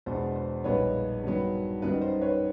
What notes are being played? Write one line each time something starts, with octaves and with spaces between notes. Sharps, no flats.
E2 B2 G#3 B3 D4 C5
C5
A#1 A#2 G3 B3 D#4 B4 C#5
G2 D#3 F#3 B3
F#2 D#3 G3 B3 D#4 B4
C5
B4 C#5